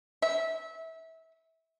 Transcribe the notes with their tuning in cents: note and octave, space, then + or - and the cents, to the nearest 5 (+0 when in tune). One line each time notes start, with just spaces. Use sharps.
E5 -25